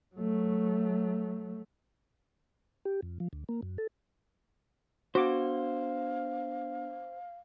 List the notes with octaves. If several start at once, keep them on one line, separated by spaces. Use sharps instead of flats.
F#3 A3
G4
F2
F3
D2
A#3
F#2
A4
B3 D4 F#4 C5 F5 D6